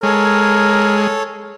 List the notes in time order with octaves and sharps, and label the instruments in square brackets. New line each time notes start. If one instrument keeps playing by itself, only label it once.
[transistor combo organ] G#3 [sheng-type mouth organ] A4 C#5 [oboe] A#4